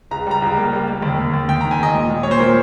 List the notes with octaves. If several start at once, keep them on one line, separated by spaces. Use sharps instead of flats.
C#2 A#5
G3 A#5
C#2
A#3
G3
A#3
D#2
D#2
D#2
D#2 G5
D#3 A#5
G#5
D#2 D#5
A#2
A#2
A#2 C#5
C5
A#2 A#4